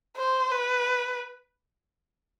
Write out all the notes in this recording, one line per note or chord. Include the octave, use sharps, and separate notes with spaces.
C5
B4